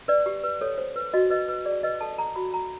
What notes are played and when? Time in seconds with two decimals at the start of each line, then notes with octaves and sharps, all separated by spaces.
0.08 B4 D5
0.26 G4
0.44 B4
0.61 A4 C#5
0.78 C5
0.96 B4
1.13 F#4 D#5
1.30 B4 D#5
1.48 B4
1.66 G#4 D5
1.83 B4 D#5
2.01 A4 A5
2.18 A4 A#5
2.36 F#4 B5
2.53 F#4 A#5